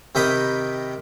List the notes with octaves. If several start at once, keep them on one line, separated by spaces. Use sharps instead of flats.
C3 D#3 A#4 G5 B5 D#6